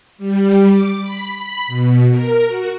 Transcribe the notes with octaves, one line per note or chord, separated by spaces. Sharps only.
G3
D6
B5
B5
B2
A#4
F#4